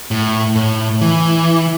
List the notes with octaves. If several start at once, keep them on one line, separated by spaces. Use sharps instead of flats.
A2
A2
E3